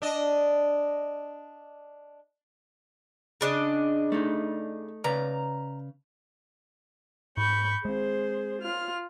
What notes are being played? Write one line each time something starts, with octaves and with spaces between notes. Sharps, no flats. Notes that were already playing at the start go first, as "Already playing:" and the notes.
D4 D#5
C#3 D4 D#5
A3 D#4
C#3 B4 D5 A#5
G#2 B5 C#6 G6
G#3 C4 G#4 C5
F4 F6